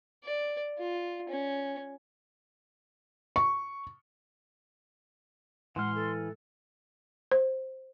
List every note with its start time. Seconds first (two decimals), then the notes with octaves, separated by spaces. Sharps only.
0.24 D5
0.79 F4
1.29 C#4
3.36 C#6
5.76 A2 E3 G#3 F#5 C6 F6
5.95 A4
7.31 C5